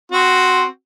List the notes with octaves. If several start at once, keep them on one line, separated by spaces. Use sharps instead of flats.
C4 F#4